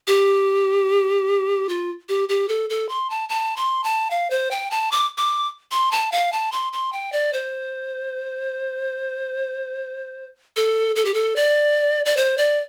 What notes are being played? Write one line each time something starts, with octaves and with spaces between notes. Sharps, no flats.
G4
F4
G4
G4
A4
A4
C6
A5
A5
C6
A5
F5
C5
G5
A5
D6
D6
C6
A5
F5
A5
C6
C6
G5
D5
C5
A4
A4
G4
A4
D5
D5
C5
D5